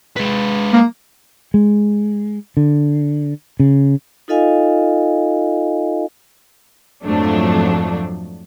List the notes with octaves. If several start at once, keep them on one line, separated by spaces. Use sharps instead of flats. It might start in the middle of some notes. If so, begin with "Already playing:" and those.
G#3 B4
A#3
G#3
D3
C#3
D#4 F4 A4 D#5 F5 G#5
F2 G#2 F3 F#3 A3 D4